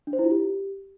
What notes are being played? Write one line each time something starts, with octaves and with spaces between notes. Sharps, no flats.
D4
C5
E4
F4
G4